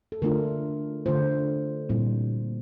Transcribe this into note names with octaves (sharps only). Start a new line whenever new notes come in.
A4
D3 A3 D4 F4 A#4
D3 A3 D4 F4 C5
A#2 G3 C4 E4